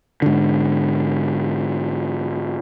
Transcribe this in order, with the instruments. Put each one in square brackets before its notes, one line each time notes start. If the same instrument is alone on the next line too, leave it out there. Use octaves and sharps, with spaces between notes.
[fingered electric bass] G#2 D3